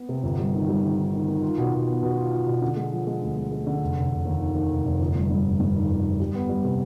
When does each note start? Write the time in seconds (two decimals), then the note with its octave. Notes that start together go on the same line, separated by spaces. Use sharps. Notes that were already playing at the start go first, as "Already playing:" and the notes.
Already playing: B3
0.09 C3
0.23 G1
0.38 G3
0.53 D#3
0.68 G3
0.83 D#3
0.97 D#3
1.13 D#3
1.28 D#3
1.42 F4
1.58 B2
1.73 B2
1.87 B3
2.03 B2
2.17 F4
2.32 F4
2.46 B2
2.62 D3
2.76 G#3
2.91 F3
3.07 G#3
3.21 D2
3.37 G#3
3.51 G#3
3.67 D3
3.81 F1
3.97 F1
4.11 F1
4.25 D#2
4.41 D#3
4.55 D#3
4.70 F1
4.85 F1
5.00 G1
5.15 G2
5.30 G2
5.45 G1
5.60 G2
5.74 D#3
5.90 G1
6.05 G1
6.20 G3
6.35 B3
6.49 G3
6.64 C3